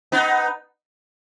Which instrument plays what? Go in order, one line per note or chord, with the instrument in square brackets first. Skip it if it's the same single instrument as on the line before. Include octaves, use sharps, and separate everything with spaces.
[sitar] B3 D#4